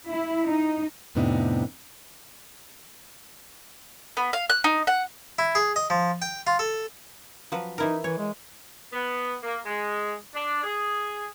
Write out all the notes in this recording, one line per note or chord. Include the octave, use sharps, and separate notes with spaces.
E4
D#4
F2 A2 C3 B3 D4 D#4
B3
F5
F#6
D#4
F#5
E4
G#4
D#5
F3
G5
F4
A4
F3 F#3 B4
E3 D#4 E4 A#4
E3 C#5
G#3
B3
A#3
G#3
D4
G#4